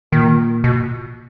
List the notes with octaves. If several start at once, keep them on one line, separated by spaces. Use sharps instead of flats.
A#2 D#3
B2